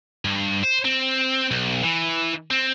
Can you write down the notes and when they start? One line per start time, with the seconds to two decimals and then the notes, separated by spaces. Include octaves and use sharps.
0.25 G2
0.63 C5
0.85 C4
1.51 B1
1.83 E3
2.51 C4